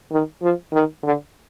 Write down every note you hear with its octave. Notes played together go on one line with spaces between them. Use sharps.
D#3
F3
D#3
D3